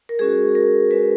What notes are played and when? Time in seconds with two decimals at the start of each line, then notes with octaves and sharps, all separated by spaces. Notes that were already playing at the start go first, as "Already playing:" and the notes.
0.09 A#4
0.19 G#3 C#4 F#4 G#4
0.55 A#4
0.91 G#3 C#4 F#4 B4